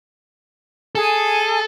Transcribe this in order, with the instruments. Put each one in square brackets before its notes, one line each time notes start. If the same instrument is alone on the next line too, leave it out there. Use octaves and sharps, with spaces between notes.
[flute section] G#4 G#5 [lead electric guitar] A4